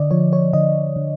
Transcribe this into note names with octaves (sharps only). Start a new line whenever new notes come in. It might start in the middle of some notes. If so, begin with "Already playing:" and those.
Already playing: D3 D5 D#5
F3 C#5
C#5
D3 D#5
D3